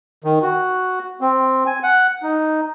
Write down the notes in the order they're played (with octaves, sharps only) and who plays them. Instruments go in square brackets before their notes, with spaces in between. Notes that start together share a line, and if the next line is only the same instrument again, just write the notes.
[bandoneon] D#3
F#4
C4
G#5
F#5
D#4